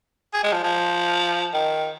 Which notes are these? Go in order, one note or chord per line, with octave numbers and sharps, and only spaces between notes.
G#4
G#3
F3
F3
D#3